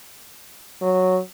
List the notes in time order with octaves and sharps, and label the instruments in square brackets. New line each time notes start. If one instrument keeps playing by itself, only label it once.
[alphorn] F#3